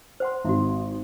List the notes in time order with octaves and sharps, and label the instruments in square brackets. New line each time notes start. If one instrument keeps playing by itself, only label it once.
[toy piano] C5 F#5 C6
[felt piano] G#1 [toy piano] E4 F#4